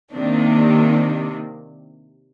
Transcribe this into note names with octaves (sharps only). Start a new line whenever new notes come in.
C3 D#3 A#3 D4